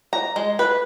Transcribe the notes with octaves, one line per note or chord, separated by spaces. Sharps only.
A#5
G#3
B4